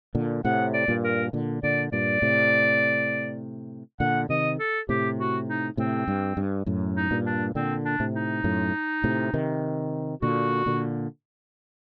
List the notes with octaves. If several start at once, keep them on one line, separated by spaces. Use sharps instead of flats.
A#2 D3
A2 C3 F#5
D5
G2 A#2
A#4
A#2 D3
A#2 D3 D5
G2 A#2 D5
A2 C3
A#2 D3 F#5
C3 D#3 D#5
A4
A2 C3 G4
F#4
D#4
A2 C3 C4
G2
G2
F#2 A2
D#4
G2 A#2
D4
A#2 D3 C4
D4
A2 C3
D#4
F#2 A2
A2 C3
C3 D#3
A#2 D3 F#4
A#2 D3